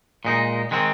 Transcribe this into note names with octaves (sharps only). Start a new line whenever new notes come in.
A#2 G#3 D#4
D#3 G#3 C4